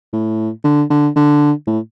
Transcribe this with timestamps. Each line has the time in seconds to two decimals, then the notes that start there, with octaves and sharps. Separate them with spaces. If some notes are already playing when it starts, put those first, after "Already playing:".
0.13 A2
0.64 D3
0.90 D3
1.16 D3
1.67 A2